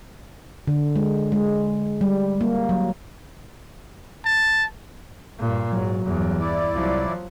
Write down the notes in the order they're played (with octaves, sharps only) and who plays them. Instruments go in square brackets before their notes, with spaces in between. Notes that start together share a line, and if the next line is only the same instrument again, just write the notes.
[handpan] D3
G#3
G#3
G3
A#3
F#3
[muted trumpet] A5
[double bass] G2 A#2
[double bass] G#2 [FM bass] F#3
[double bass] E2 G2
[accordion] E4 D5
[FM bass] C2 [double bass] F3 F#3